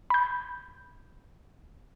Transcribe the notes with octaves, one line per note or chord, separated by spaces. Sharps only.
B5 G6